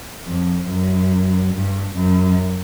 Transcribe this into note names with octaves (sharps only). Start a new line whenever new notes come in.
F2
F#2
G2
F#2